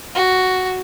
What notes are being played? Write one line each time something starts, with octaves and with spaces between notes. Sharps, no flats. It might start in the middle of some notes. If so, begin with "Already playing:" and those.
F#4